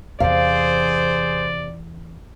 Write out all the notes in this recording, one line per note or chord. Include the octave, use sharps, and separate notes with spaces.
E2 C3 E3 G#4 C5 D5 F5